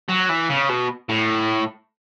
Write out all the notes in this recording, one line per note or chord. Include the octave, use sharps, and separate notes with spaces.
F#3
E3
C#3
B2
A2